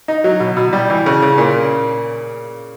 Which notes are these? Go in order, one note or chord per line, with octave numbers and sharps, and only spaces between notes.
D#4
F#3
B2
B2
G3
E3
C#3
C#3
A#2